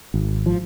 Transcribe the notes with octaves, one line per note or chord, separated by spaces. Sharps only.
G#1
F3